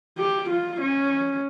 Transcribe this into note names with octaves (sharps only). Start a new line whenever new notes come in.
G4
F4
C#4